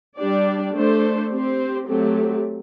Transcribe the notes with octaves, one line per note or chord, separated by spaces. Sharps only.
G3 D4 G4 D5
A3 D4 A4 C5
C4 G4 C5
F#3 A3 C4 G4